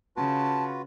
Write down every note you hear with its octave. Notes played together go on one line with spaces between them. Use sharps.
C#3 F4 F#4 B4 A5